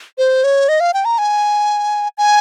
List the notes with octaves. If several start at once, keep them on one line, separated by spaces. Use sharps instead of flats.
C5
C#5
D#5
F5
G5
A#5
G#5
G#5